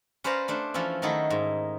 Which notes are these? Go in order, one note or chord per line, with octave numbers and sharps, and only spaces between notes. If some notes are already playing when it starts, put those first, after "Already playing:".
C#4 B4 C5 D5 F5 A#5
A3 D4 C5
E3 F3 A3 C#4 E4
D#3 F#3 A3 D#4 E4
G#2